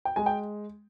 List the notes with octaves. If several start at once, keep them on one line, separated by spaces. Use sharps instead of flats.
G5
G#3 G#5
G5